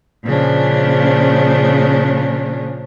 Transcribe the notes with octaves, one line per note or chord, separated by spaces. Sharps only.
A#2 C#3 F3 C#4 D4